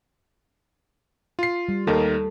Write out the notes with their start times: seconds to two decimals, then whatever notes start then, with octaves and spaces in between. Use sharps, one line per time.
1.39 F4 C7
1.69 G3
1.87 D#2 D#4 A4 A#4